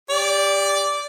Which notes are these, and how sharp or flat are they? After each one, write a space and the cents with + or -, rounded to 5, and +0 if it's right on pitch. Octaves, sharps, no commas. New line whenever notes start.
G4 +25 D5 -10